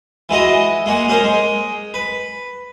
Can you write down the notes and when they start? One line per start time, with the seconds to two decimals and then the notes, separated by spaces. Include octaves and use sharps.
0.29 E3 G#3 F#4 D#5
0.86 G#3 A#3 F#5
1.08 C#4 G#4 A#4 C5
1.24 G#3
1.94 B4